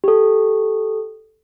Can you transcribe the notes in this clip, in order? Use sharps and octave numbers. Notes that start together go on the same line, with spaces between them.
G4 A4